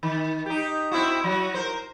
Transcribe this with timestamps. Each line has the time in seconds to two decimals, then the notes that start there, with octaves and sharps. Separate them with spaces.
0.03 D#3
0.46 D#4 G4
0.91 C4 E4 F#4
1.24 F#3 F#4
1.54 A#4 C5